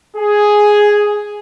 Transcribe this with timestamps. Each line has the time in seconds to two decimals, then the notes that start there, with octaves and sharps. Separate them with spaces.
0.17 G#4